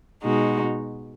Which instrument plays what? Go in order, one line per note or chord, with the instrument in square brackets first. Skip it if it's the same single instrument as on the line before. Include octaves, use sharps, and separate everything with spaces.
[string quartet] B2 G#3 D#4 F#4